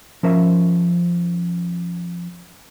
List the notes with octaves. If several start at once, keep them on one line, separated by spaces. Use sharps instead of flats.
F3 C#4 A#4 C5 E5